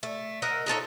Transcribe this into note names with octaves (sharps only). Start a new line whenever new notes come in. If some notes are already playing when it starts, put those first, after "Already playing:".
A3
A#4 D#5 E5 F#5
D#4 F4 A4 C#5